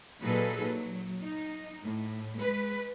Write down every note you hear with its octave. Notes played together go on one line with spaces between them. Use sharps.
A#2 F#3 D#4 G#4 A4 B4
F#3
D#4
A2
G#3 B4